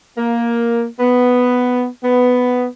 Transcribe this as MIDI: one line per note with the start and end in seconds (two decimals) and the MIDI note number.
0.18 0.86 58
1.00 1.86 59
2.04 2.67 59